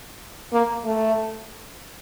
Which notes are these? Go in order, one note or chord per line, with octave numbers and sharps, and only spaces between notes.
A#3
A3